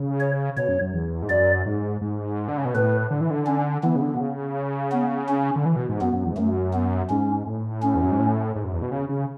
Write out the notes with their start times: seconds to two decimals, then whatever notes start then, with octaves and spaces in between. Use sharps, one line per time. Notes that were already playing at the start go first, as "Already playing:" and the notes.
Already playing: C#3
0.20 C#5
0.57 B2 C#5
0.68 F#2
0.81 F#2
0.93 E2
1.22 G#2
1.29 F#2 D5
1.66 G#2
2.01 G#2
2.48 D3
2.58 C#3
2.65 B2
2.74 A2 B4
3.11 D3
3.21 E3
3.31 D3
3.47 C#4
3.83 E3 B3
3.96 C#3
4.02 D3
4.15 B2
4.20 C#3
4.92 B3
5.29 C#4
5.56 D3
5.65 E3
5.76 B2
5.89 G#2
6.01 F#2 B3
6.13 F#2
6.25 E2
6.32 G#2
6.37 F#2 A3
6.74 B3
7.10 G#2 C#4
7.47 A2
7.83 C#4
7.95 E2
8.03 F#2
8.11 G#2
8.19 A2
8.55 G#2
8.64 F#2
8.73 E2
8.82 B2
8.91 C#3
9.09 C#3